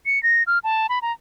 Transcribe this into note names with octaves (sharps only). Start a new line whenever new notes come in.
C#7
A#6
F6
A5
B5
A#5